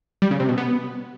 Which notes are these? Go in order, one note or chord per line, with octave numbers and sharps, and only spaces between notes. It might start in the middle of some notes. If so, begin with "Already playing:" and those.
G3
C#3
C3
B2
B3